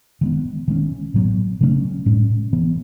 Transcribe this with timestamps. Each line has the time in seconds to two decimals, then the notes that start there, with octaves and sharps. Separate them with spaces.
0.21 D#3 G#3 B3
0.68 D#3 G#3 C#4
1.14 A2 F#3 B3
1.61 C#3 F#3 A3 C#4
2.06 A2 G#3 C#4
2.53 E3 B3